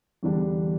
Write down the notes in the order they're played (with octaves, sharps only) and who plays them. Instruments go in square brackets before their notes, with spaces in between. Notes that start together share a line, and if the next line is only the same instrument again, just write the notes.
[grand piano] E2 D3 G3 D4